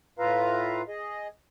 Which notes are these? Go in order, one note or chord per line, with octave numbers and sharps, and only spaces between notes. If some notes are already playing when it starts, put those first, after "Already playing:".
A2 F4 B4 E5 F5 A#5
G#4 D#5